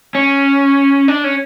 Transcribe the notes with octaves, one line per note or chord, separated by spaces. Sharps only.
C#4
D4
C#4